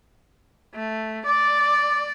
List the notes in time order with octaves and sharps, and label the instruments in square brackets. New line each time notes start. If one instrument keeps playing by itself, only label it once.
[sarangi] A3
[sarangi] D5 [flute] D6